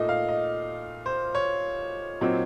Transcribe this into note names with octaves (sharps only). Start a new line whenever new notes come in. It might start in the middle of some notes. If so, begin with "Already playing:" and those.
Already playing: A#2 A3 D#4 D#5
F5
D#5
C5
C#5
A#2 F#3 C4 D#4